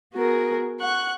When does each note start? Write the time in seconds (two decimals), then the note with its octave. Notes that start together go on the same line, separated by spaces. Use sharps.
0.13 B3 F#4 G#4 A#4
0.81 F#5 C#6 F#6